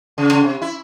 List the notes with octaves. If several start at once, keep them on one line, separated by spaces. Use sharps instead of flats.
C#3
C#3
C3
E4